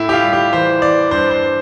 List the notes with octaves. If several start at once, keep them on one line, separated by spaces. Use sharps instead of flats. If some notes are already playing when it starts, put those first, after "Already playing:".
Already playing: A2 E4
G4
F4
G3
G4
E3 C5
E3 D5
G2 C5
C5